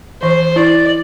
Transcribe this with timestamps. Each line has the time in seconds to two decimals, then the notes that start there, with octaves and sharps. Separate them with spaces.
0.22 E3 C5
0.56 E4 D5